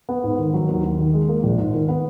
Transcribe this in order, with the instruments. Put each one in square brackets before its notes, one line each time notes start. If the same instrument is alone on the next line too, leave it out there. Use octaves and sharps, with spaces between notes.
[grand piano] B3
G#2
D#3
F#3
D#2
D#2
D#3
G#3
A#3
A#1
G#2
D#3
B3